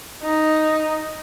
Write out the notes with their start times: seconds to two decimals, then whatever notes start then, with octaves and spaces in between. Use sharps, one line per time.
0.23 D#4